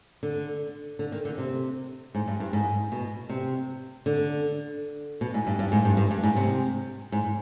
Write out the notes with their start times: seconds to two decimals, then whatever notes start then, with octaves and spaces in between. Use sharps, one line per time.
0.23 D3
0.99 D3
1.12 D#3
1.25 D3
1.38 C3
2.15 G#2
2.28 G2
2.40 G2
2.53 G#2
2.92 B2
3.29 C3
4.06 D3
5.21 B2
5.34 G#2
5.47 G2
5.59 G2
5.72 G#2
5.85 G2
5.97 G2
6.11 G2
6.24 G#2
6.37 C3
7.12 G#2